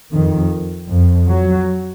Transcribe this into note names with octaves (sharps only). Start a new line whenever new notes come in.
F2 D#3
F2
F#3